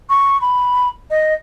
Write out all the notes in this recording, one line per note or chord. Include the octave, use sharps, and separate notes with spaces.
C#6
B5
D#5